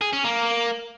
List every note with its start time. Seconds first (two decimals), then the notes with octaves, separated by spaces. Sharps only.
0.01 G#4
0.13 C#4
0.24 A#3